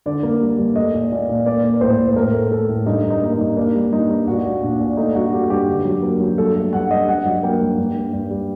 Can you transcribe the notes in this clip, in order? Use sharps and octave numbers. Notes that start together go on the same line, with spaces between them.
D3 D5
A#3
G3
G2
A3 D#5
A#2
A#2
A#2
A#3 D5
A#3
A2 C5
A2
A2 A#4
A3
A3 A4
A2
G2 D#4
G2
D#4
A#3
G2 D#4
A#3 D4
G3
G2 D#4
G2
A#2 F#4
A#2
A#2 D4
A#2
A3 D#4
G2 F#4
A3 G4
G2 G4
D3
F#3
A#3
F#3
G2 A4
A3
G2 F#5
G2 D#5
G2 F#5
F#3
A#3 G5
G2
G2
G2
G2
G3